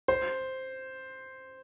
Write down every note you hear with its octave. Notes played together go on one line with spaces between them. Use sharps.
C5